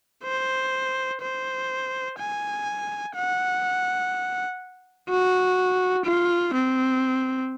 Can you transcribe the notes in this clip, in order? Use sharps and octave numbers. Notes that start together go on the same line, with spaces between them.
C5
C5
G#5
F#5
F#4
F4
C4